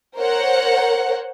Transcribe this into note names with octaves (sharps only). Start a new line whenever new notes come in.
A#4 C5 C#5 F#5